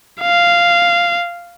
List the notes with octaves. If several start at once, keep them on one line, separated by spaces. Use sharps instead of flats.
F5